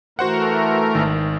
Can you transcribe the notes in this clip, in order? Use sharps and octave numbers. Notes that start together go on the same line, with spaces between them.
E3 A3 F#4 A#4 C5 F#5
G#1 D#3